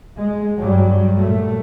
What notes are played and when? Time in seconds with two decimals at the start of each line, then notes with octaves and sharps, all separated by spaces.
0.19 G#3
0.59 G2 F#3 G3
1.20 A#2 A3